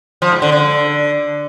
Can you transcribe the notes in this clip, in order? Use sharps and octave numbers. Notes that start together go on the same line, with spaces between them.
F3
G#2
D3
D3